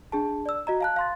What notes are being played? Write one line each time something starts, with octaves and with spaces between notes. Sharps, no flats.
D4 G#4 A5
D5 E6
F#4 D#5 A#5
F5 A5 F#6
F5 C6 A6